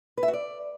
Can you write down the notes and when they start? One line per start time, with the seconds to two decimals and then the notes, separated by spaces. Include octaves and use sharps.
0.17 B4
0.23 E5
0.28 F#4
0.33 D5